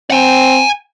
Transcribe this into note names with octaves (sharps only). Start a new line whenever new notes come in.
C4 F#5 G#5